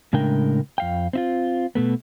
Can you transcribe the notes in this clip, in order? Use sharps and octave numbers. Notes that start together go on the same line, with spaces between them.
A2 C#3 G#3 D4 A#4 G5
F2 F5 G5
C4 E4 F4
B2 A3 B3